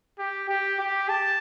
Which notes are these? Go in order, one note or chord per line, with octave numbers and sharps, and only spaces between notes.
G4
G4
G4
A5